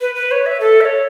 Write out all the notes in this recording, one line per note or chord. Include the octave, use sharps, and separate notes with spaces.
B4
B4
C#5
E5
A4
E5
C#5